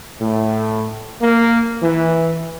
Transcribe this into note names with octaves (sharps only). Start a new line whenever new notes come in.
A2
A#3
E3